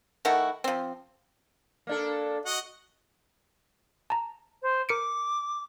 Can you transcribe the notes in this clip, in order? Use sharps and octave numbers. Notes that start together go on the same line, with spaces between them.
D#3 A3 E4 F#4
F3 C4
A#3 D4 A4
F#4 D#5 F#5
A5 A#5
C5
A#4 D6 C#7 D7